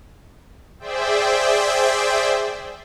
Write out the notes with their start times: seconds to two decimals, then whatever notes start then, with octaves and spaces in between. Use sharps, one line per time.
0.80 G#4 C5 D5 E5 G5